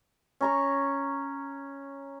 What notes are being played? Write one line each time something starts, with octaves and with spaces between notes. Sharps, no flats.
C#4 A#5 C#6